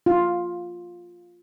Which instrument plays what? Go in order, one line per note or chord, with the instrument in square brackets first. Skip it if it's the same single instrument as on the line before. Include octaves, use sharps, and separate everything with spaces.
[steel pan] F4